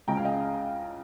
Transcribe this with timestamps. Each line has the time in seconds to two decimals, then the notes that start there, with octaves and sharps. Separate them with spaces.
0.08 C#2 C#3 G#3 C#4 G5 A#5
0.17 F5 G#5
0.25 D#5 G5